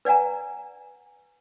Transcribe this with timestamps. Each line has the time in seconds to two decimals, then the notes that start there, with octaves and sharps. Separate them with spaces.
0.05 B4 D5 F#5 G#5 A#5